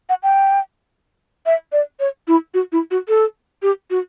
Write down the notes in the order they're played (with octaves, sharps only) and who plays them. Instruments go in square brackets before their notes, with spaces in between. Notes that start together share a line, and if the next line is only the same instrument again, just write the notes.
[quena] F#5
G5
E5
D5
C#5
E4
F#4
E4
F#4
A4
G4
F#4